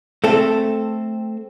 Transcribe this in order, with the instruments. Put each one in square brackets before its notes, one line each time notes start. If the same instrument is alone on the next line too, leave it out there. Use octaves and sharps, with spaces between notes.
[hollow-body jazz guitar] A3 C4 A4